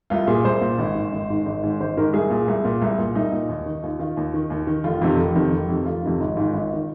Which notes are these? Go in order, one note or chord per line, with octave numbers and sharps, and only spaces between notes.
C2 F4
A#2 G#4
C2 C5
A#2
G#1
G#2 D#3
G#1
G#2 D#3
G#1
G#2 D#3
G#1 C5
G#2 D#3 A#4
C2 G#4
A#2
C2
A#2
C2
A#2
C2 D#4
A#2
D#2
D#3
D#2 F4
D#3 F4
D#2
D#3
D#2
D#3
F1 F4
F2 C3 D#3
F1
F2 C3 D#3
F1
F2 C3 D#3
F1 F4
F2 C3 D#3
G#1 D#4
G#2 D#3 F4
G#1
D#3